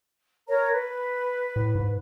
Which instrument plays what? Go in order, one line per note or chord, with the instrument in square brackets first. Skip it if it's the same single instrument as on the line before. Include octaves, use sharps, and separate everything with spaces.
[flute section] A#4 C#5 A#5
B4
[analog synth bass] A2
G#2